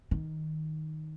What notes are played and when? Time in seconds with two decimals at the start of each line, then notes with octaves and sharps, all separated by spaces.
0.11 D#3